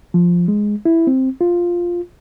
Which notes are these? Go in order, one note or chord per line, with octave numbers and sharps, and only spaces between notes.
F3
G#3
E4
C4
F4